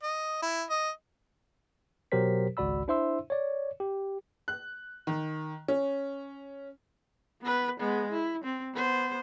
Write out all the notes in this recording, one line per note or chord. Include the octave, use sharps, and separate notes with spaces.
D#5
E4
D#5
B2 F#3 G4 A#4 C5 B6
G#1 C#2 F#4 D5 B5 E6
D4 E4 C5 E5 C6 E6
C#5 D5
G4
F#6
D#3
C#4
B3 B4
G#3 B3
E4
C4
B3 C5